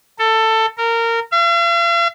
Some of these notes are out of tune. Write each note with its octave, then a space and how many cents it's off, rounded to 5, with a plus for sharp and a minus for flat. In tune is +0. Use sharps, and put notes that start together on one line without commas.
A4 +15
A#4 -20
F5 -45